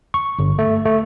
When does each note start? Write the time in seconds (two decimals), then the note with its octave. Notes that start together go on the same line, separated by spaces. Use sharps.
0.14 C#6
0.39 G1
0.59 A3
0.85 A3